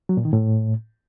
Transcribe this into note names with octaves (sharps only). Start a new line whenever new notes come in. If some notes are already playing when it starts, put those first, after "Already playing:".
F#3
A#2
D#3
A2